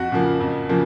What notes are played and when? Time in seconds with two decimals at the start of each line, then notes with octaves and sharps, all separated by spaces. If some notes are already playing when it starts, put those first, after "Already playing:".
Already playing: F2 F#4
0.12 C#3 F3 A#3
0.40 F2
0.69 C#3 F3 A#3